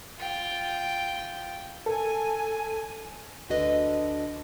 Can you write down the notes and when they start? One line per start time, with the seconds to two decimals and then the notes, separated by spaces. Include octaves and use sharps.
0.18 F4 G5
1.86 A4 G#5
3.49 D2 D3 F#4 B4 D#5